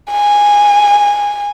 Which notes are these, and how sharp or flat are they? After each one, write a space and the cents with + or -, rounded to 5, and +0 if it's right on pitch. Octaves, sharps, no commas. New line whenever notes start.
G#5 -15